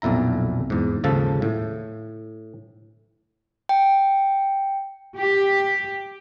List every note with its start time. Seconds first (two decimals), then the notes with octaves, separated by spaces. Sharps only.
0.02 B1 F2 A#2 E4 A#5
0.70 E2 G#2
1.04 D#2 G#2 C#3 F3 A4 A5
1.42 A2
3.69 G5
5.18 G4